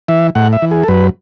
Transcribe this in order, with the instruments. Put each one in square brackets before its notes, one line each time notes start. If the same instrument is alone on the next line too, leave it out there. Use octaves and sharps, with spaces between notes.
[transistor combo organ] E3 E5
A2 F#5
E5
E3
G#4
A4
F#2 B4